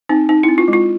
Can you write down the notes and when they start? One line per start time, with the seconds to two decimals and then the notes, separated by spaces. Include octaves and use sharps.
0.09 C4 D#4
0.29 D#4
0.43 C4 E4
0.58 F4
0.68 G#3
0.73 F4